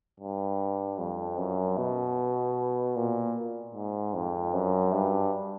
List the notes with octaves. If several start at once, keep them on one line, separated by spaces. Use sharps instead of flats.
G2
F2
F#2
B2
A#2
G#2
F2
F#2
G2